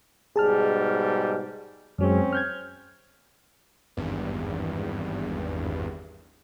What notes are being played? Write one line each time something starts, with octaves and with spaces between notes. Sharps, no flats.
G#2 B2 G3 G#4 A5 F6
F#2 F#3 G#3 C4 C#4
F6 G6 G#6
G#1 E2 G2